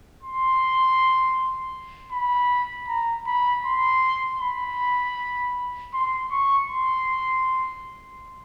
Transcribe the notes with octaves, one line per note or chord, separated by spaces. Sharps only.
C6
B5
A#5
B5
C6
B5
C6
C#6
C6